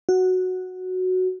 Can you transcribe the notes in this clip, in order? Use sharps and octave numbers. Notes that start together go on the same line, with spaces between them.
F#4